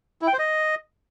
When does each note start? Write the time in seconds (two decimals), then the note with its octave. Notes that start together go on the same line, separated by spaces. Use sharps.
0.22 E4
0.27 G5
0.33 C5
0.39 D#5